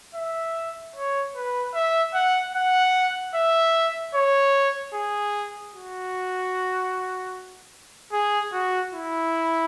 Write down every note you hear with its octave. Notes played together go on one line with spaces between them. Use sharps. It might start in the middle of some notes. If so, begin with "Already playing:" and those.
E5
C#5
B4
E5
F#5
F#5
E5
C#5
G#4
F#4
G#4
F#4
E4